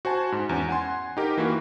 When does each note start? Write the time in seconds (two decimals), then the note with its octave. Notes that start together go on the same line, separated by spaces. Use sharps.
0.05 F#4 C5 G#5 A5
0.32 G#2
0.49 E2 C#4
0.69 F#5 G#5 C6
1.17 D#4 G4 A#4
1.37 E3 A#3 F#4 A#4